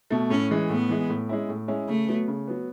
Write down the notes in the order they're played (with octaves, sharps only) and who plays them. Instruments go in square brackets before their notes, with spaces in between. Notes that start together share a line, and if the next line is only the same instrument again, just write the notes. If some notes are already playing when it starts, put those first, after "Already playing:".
[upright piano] B2 A3
[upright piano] A2 [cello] C#4
[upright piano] E3 G#3
[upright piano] A2 [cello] B3
[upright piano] E3 G#3
A2
G#3 C#4 E4
A2
G#3 C#4 E4
[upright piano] C#3 [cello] A3
[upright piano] F#3 B3
C#3
F#3 B3